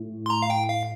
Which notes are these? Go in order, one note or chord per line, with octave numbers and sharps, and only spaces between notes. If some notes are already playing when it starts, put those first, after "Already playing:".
Already playing: A2 A3
C6
A#5
F5
G5
F5